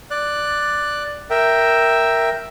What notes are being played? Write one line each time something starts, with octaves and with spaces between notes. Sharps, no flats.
D5 F#6
A#4 E5 G5